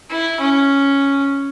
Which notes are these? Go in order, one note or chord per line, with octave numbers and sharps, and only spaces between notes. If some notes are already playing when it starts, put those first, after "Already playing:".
E4
C#4